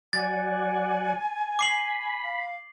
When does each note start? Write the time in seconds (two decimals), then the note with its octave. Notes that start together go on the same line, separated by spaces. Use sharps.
0.13 F#3 D5 F#5 G#5 A6
1.59 B5 D6 C7 F#7
2.23 F5